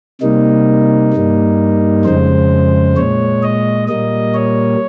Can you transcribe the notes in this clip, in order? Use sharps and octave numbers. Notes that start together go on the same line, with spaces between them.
C3 G3 A#3 D#4
G2 G3 A#3
F2 C#3 G#3 C5
A#2 G#3 C#5
D#5
A#2 G3 A#3 D#5
C#5